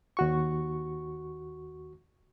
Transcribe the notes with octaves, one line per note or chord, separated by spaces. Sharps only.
D#2 F#4 C#6